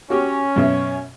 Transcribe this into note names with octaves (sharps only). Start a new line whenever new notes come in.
C#4 F#4 G4
F#2 B2 E5